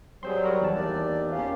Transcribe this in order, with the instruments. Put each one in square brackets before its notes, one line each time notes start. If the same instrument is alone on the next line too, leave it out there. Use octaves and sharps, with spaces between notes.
[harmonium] F#3 G3 [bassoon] C4 [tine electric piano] G#4 C5 C6
[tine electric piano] F#4 A#4
E2 A5
[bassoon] D#2 [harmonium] D5
[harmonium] A#3 C#4 G4 [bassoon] F4